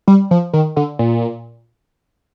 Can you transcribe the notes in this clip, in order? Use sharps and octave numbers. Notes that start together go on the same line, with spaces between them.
G3
F3
D#3
D3
A#2